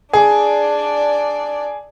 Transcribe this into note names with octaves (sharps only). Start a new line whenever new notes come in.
D4 G#4 D5